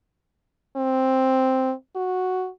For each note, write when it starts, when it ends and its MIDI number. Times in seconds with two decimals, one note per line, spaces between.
0.76 1.73 60
1.96 2.49 66